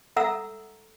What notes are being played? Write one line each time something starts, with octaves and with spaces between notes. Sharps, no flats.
A4 E5 F#5 A#5 D#6 E6